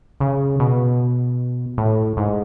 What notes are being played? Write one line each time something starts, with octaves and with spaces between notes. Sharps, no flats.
C#3
B2
A2
G#2